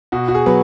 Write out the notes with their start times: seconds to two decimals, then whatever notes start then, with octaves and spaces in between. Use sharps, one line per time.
0.12 B2 F#4
0.28 F#4
0.35 G#4
0.46 F#3 B3 B4